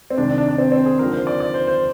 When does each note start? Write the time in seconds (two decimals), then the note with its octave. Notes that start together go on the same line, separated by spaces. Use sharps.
0.10 C4
0.17 C2 C3 D#3 G#3 D4
0.28 D4
0.38 D4
0.48 D4
0.58 C4
0.72 C4
0.85 G#4
0.99 D#2 D3 F3 G#3 A#4
1.13 C5
1.27 D5
1.40 D5
1.54 C5
1.67 C5